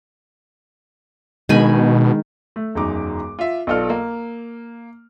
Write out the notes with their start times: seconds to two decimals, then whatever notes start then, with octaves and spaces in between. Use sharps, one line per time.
1.49 B2 D#3 G#3 D4 G#4 G#5 B5
2.56 A3
2.75 E1 F#2 D#4 D6
3.39 F4 E5
3.67 B1 B2 F4 A4 D5 F6
3.90 A#3